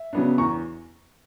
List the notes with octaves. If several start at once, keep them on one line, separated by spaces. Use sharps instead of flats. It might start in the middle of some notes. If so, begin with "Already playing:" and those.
Already playing: E5
C#3 F#3 B3 D4
E2 A#5 C#6